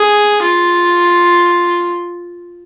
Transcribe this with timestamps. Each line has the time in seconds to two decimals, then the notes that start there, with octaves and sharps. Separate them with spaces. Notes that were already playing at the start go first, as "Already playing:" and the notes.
Already playing: G#4
0.42 F4